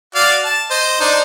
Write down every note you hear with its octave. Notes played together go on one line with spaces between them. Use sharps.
F#4 D5 F5
A5
C5 D#5
D4 D#4 C5